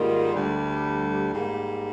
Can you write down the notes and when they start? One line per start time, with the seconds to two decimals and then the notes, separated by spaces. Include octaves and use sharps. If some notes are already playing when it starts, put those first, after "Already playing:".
Already playing: G#2 D#3 G3 A#3 F4
0.32 D2 D3 G3
1.33 G#2 G3 A#3